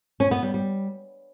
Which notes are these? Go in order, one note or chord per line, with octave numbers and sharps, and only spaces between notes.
C#4
B3
G3
G3